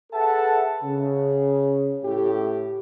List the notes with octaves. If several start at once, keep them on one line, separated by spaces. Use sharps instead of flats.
G#4 A4 B4 E5 F#5 A5
C#3
A2 G4